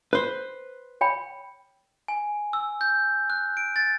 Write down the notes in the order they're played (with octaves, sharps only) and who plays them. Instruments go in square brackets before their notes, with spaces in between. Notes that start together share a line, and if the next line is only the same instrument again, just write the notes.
[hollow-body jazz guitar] B4 C5
[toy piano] C#5 G5 B5
[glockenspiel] G#5
E6
G6
F#6
D7
A6